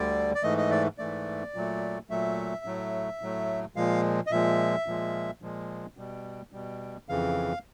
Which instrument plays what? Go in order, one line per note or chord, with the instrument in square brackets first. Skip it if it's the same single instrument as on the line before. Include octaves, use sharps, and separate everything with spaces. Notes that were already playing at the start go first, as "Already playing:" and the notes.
Already playing: [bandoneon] D2 D3 G3 D5
D5
G#2 E3 A3 D#5
D#5
D5
G#2 E3 A3 D5
A#2 F#3 A3
A#2 F#3 A3 E5
A2 F#3 A3
A2 F#3 A3
A#2 F3 G#3 F5
D#5
A#2 F3 G#3 E5
A#2 F3 G#3
A#2 F3 G#3
B2 G3
B2 G3
F2 C#3 E3 F5